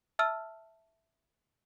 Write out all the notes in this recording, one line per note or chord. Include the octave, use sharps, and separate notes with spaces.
E5 A5 E6 F6